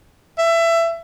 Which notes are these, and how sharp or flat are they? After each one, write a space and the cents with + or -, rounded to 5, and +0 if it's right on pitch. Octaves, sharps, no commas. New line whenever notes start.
E5 +20